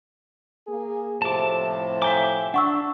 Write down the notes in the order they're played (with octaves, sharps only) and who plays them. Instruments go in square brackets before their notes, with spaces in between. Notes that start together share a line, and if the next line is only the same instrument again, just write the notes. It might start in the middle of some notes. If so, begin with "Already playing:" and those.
[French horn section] A#3 G#4
[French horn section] A2 C3 F3 [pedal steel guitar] A5 D6
[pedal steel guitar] E5 G5 D6 [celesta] G#5 A#5
[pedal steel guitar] D4 [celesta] F#5 C#6 E6